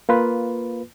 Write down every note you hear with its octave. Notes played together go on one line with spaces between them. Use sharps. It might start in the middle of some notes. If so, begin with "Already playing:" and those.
A#3 F4 B4